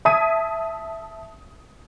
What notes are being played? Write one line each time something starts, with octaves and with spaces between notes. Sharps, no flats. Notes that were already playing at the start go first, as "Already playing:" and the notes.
E5 A5 D#6 G#6 B6 D#7